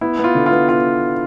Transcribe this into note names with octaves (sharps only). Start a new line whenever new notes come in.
B3 E4
B3
F4
D3
F4
B3
B3 F4